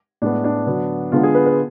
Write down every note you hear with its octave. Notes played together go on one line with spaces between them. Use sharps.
A2 G#3 B3 D4
D4
D3 F#3 B3
D3 G#3 B3 F4
G#4
B4
B4